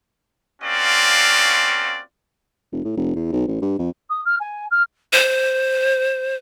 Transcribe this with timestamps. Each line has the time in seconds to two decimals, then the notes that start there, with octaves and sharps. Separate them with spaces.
0.61 A#3 C4 C#4 F4 F#4 D5
2.72 F1
2.85 A2
2.97 F1
3.16 E2
3.32 B1
3.48 A1
3.62 G2
3.79 F2
4.09 D#6
4.25 F6
4.40 G#5
4.71 F6
5.13 C5